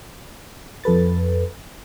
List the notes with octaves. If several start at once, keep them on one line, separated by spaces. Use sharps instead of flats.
F2 A4 B4 A6